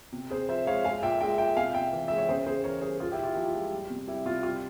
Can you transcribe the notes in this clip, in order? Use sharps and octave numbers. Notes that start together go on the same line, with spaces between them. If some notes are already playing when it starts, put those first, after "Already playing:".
C3
C3 G#4 C5
F3 C5 E5
G#3 C#5 F5
G#3 F5 G#5
A#2 E5 G5
G#3 E5 G5
A#2 E5 G5
C3 F5 G#5
C3 E5 G5
E3
G#3 E5
C#5
C#3 G#4 C5
C#3 G#4 C5
E3 A#4 C#5
G3 G#4 C5
A#2 F4 G#4
E4 G4
A#2
F4
F3 G4
F4
G#3
G3
C3
G3 E4
C3 F4
G3 F4